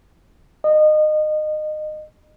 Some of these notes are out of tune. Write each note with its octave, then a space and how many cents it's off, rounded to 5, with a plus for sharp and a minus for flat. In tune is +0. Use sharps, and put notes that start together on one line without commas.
D#5 -25